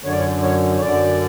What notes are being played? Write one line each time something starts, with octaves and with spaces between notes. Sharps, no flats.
F#2 D3 C#5
D5
C#5
C#5
C#5
F#2 D3 D5